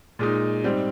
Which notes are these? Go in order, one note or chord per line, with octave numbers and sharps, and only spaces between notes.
A#2 G#3 D#4
G#2 G3 C4